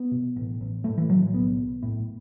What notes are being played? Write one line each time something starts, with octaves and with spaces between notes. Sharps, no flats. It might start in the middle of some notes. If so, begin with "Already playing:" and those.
Already playing: B3
B2
A1
A1
A2 A3
E3
A2 F#3
B1 B3
B1
A2